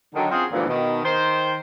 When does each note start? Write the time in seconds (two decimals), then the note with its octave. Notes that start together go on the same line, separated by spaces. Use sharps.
0.15 D3 D#3 F#3
0.31 C4 C#4 F4 F#4 G#4
0.51 D2 G2 A#2 E3 F3 B3
0.68 B2 D#3
1.03 D#3 C5